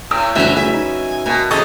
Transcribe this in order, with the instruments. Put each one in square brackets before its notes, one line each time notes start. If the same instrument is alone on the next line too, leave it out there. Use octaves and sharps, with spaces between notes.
[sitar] A2 [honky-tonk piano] E6 G6 D7
[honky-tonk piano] F#1 D2 G2 [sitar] E3 [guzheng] F#3 C#4 B4 [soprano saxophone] E5
[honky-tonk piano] A2 C#3 E3 [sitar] E5 [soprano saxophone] G#5
[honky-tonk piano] D#4
[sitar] B2 [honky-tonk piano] A#3 A5
[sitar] E2 C#3 D#5 [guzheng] C#4 G#4 A4 [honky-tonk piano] C#6